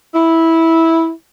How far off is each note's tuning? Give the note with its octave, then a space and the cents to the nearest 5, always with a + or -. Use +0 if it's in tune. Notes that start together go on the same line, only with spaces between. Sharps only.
E4 -10